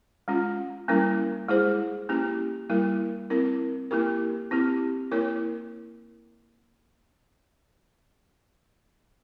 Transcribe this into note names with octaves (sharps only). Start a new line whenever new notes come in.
G#3 C#4 F4
G3 A#3 C#4 E4 A#4
G#3 E4 G#4 C5
A#3 C#4 E4 G4
G3 A#3 E4 A#4
C4 E4 A#4
A#3 E4 G4 A#4
C4 E4 G4
A#3 E4 A#4 C#5